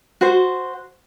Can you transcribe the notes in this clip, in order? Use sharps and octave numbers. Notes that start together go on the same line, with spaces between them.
F#4 C5